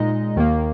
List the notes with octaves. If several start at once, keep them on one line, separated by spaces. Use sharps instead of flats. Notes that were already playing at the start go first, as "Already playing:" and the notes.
Already playing: A#2 G#3 D#4 D#5
D#2 D#3 A#3